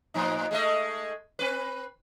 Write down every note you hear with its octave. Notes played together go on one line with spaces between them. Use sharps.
A2 F3 D#4
G#3 A3 D#5
C4 B4